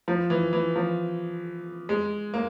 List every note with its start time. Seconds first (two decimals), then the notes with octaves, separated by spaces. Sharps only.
0.08 F3
0.30 E3
0.53 E3
0.76 F3
1.89 G#3
2.34 A#3